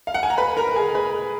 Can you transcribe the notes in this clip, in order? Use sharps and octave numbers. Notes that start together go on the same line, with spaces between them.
F5
F#5
G#5
A#5
B4 B5
A#4 A#5
G#4 G#5
B4 B5